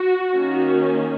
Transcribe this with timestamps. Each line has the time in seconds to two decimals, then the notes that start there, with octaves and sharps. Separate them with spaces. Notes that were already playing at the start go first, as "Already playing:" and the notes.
Already playing: F#4
0.33 D#3 A#3 C#4